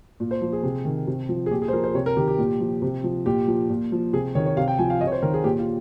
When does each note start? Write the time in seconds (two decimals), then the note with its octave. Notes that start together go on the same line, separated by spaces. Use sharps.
0.20 A#2
0.31 C5
0.41 F3
0.53 G#4
0.63 C3
0.85 D#3
1.07 C3
1.29 F3
1.46 G#4
1.51 A#2 G4
1.62 G#4
1.68 C5
1.73 F3 A#4
1.84 C5
1.94 C3 C#5
2.06 A#4
2.17 D#3 G4
2.28 G4
2.39 A#2
2.60 F3
2.82 C3
3.04 F3
3.26 A#2 G4
3.48 F3
3.69 A#2
3.92 F3
4.13 C3 G#4
4.35 D#3 C#5
4.46 C#5
4.57 C3 F5
4.68 G5
4.79 F3 G#5
4.90 F5
5.01 C3 D#5
5.07 C#5
5.12 C5
5.22 D#3 A#4
5.34 G#4
5.44 A#2 G4
5.59 F4